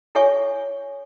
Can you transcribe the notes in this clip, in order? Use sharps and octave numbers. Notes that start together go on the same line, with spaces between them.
E4 A4 C#5 E5 G#5 C#6